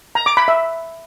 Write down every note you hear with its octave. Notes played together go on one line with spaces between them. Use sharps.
A#5
D6
B5
E5